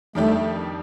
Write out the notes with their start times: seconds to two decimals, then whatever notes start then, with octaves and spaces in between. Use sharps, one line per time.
0.15 F2 D#3 G3 A3 D4 G4